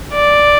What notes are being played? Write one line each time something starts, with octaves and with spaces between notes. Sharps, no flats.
D5